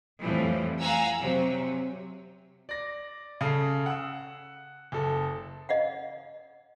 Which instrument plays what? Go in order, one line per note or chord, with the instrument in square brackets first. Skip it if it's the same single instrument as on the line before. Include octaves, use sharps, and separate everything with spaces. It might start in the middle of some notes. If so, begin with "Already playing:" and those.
[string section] F2 A2 E3 F3 G3
F5 F#5 G#5 A#5 E6
C3 F#3
[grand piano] D5 A#6
C#3 A4 C7
F#5 E6
F#1 A4
[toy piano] D#5 F5 F#5